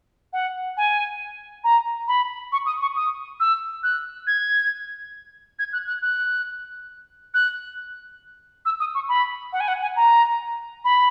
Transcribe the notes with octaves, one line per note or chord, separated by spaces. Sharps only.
F#5
G#5
A#5
B5
C#6
D#6
C#6
D#6
E6
F#6
G#6
G#6
F#6
F#6
F#6
F#6
E6
D#6
C#6
B5
F#5
G#5
F#5
G#5
A#5
B5